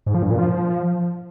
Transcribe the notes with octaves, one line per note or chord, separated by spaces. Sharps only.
G#2
F3
G2
A#2
F3